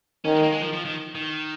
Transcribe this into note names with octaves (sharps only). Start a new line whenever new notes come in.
D#3 C#4
G#3
A#3
G#3
F3
F3
D#3
D#3